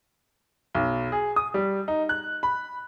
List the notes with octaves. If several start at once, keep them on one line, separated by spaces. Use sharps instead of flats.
B1
G#4
D#6
G3
D#4
F#6
B5